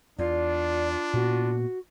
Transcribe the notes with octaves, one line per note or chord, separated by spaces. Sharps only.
E2 D4 F4 D5
A#2 B3 F#4